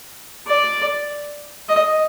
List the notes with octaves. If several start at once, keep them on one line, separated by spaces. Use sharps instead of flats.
D5
D#5